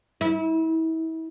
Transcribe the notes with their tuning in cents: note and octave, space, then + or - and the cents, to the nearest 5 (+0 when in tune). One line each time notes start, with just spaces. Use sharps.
E4 -35